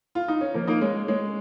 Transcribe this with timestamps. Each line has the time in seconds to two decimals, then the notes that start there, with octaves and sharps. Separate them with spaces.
0.15 F4
0.28 D#4
0.41 C#4
0.54 F3 A#3
0.67 A#3 D#4
0.81 G#3 C#4
1.08 G#3 C#4